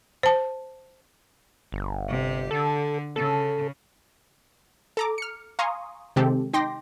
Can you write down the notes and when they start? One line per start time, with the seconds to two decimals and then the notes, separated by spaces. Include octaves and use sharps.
0.23 C5 A5
1.72 G1
2.08 C3 G4
2.51 D3 A4
3.16 C#3 A4
4.97 A4 A#5 D6
5.18 F6 C#7
5.59 F5 G#5 A#5 C6 C#6 D#6
6.16 C3 D#3 G#3 C4 G4 A4
6.53 D#4 G5 C6 D6 A#6